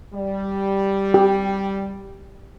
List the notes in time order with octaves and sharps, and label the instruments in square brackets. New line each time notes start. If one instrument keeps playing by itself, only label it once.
[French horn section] G3
[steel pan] G4